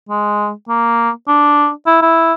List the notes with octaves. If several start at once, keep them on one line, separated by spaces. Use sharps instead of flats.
G#3
A#3
D4
E4
E4